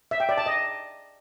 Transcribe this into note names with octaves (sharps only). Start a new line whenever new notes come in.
E5
G5
D5
A5
D#5